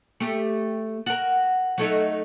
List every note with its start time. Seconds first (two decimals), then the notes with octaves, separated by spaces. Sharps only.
0.20 A3 G4
1.06 F#4 A#4
1.78 F#3 A3 D#4